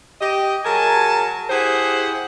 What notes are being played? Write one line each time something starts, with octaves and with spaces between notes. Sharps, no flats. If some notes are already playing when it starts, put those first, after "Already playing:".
G4 D#5
F#3 G#4 A#4 G#5 A5
E4 G4 G#4 C5 F#5